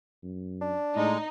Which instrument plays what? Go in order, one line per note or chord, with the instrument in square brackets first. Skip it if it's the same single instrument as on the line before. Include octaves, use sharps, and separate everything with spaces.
[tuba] F#2
[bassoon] D4
[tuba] A2 [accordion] G#3 [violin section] D#4